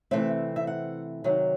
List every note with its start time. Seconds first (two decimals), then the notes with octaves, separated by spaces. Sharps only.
0.11 C3 E3 A3 C4 E5
0.56 E5
0.67 F#5
1.24 C3 D#3 F#3